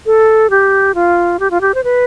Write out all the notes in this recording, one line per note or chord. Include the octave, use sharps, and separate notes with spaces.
A4
G4
F4
G4
F4
G4
C5
B4